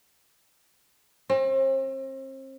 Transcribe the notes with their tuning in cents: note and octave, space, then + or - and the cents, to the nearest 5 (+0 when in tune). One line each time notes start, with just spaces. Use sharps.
C4 +40